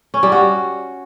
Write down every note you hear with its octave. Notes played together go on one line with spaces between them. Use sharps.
C#4
G3
F#4